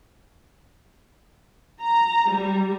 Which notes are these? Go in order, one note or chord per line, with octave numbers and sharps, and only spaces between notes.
A#5
G3